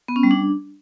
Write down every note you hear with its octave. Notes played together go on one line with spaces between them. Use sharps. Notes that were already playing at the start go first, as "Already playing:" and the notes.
B3
C#4
G3
D4